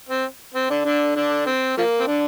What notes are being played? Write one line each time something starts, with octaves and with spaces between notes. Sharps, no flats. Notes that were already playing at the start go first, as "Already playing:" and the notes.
C4
C4
D3 D4
D3 D4
D3 D4
C4
F3 A#3
C4
D3 D4